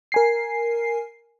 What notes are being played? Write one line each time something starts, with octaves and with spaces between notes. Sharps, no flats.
A#4 G#5 C7